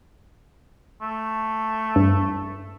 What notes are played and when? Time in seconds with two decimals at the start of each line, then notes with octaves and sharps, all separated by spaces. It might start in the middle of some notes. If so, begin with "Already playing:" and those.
1.02 A3
1.96 G2